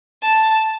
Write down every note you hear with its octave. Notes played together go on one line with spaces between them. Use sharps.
A5